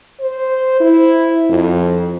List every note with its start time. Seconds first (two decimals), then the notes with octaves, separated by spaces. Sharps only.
0.20 C5
0.80 E4
1.50 F2